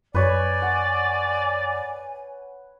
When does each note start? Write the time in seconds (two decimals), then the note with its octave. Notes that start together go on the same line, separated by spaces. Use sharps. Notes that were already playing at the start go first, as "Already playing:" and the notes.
0.15 F#2 B4 C#5 D5 G#5
0.62 F#5